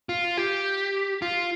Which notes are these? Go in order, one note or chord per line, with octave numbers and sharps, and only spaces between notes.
F4
G4
F4